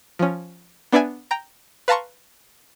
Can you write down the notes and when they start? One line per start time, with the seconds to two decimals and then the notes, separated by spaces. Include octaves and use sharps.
0.19 F3 C#4
0.92 B3 D4 B4 D5 E5 G#5
1.31 G5 A#5
1.88 B4 F5 A5 A#5 C6 C#6